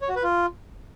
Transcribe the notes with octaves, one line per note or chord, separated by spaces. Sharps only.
C#5
F#4
B4
F4